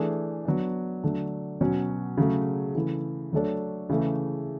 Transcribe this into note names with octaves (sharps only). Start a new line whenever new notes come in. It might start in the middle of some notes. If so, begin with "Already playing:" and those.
Already playing: E3 A3 D4 G#4
F#3 B3 D4
D3 F#3 A3 D4
B2 F#3 C#4
C#3 F#3 A3
C#3 E3 A3 E4
F#3 A3 D4 A4 C#5
C#3 E3 A3